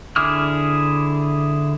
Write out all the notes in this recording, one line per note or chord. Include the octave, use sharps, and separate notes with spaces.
D3 E4 G#4 D6 F6